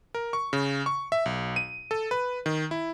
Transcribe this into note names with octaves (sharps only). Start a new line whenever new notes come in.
A#4
C#6
C#3
C#6
E5
B1
D#7
A4
B4
D#3
E4